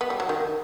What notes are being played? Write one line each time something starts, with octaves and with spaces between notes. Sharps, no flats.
B3
G3
F#3
D#3